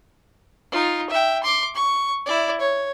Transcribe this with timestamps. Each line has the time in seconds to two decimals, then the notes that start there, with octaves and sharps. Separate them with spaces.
0.72 D#4 F4
1.10 E5 G5
1.43 C6 D6
1.75 C#6
2.26 E4 D5
2.61 C#5